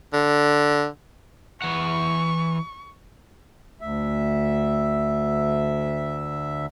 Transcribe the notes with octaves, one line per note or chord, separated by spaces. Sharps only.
D3
E3 F#5 C#6
D2 E5